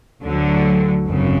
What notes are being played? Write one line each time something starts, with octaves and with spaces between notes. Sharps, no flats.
D2 D3 F#3
G#1 F#2 C#3